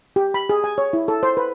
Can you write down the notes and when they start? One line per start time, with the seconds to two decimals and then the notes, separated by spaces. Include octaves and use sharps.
0.16 G4
0.34 B5
0.49 G#4
0.64 G#5
0.78 C#5
0.93 E4
1.08 A4
1.23 C5
1.37 B4